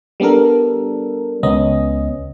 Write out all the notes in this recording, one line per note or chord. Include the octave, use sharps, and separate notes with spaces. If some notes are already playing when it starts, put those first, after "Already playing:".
G3 B3 D4 A4 A#4
C#2 B3 C#4 D#5